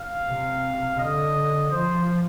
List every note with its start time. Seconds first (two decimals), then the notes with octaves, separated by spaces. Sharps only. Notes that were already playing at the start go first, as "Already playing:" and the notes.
Already playing: F5
0.27 C3
0.99 D3 D#5
1.71 F3 C5